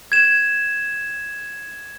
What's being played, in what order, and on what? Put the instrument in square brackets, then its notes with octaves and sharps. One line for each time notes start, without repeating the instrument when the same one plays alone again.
[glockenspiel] G#6 E7